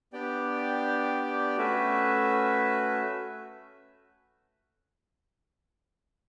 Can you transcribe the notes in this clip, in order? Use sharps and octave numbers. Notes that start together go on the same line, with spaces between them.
B3 D4 G4 D5 G5
A3 C#4 F#4 B4 E5